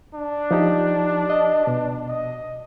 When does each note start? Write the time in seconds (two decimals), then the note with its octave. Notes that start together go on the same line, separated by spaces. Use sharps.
0.15 D4
0.51 F3 D#4 G4
1.30 D#5
1.67 B2
2.09 D#5